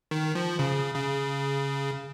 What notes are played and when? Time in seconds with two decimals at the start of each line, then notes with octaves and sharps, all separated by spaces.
0.11 D#3
0.35 F3
0.59 C#3
0.94 C#3